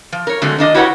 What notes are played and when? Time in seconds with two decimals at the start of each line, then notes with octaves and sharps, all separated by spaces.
0.12 F3
0.27 A#4 C#5
0.42 D3 F#3 G#3 A3 C4
0.59 D#3 D4 D#5
0.74 E4 F#4 G4 B4 C#5 F#5